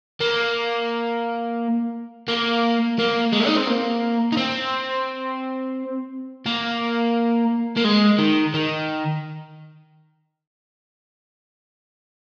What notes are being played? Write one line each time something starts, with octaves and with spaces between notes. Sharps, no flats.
A#3
A#3
A#3
G#3
D#4
C4
A#3
D#4
C4
A#3
A#3
G#3
D#3
D#3